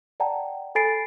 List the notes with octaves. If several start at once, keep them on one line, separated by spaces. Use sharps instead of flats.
D5 F#5 G5 A5 A#5
A4 G#5 B5 A6 C7 D7